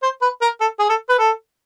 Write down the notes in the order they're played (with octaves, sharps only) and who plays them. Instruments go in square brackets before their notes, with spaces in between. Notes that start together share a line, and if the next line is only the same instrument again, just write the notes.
[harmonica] C5
B4
A#4
A4
G#4
A4
B4
A4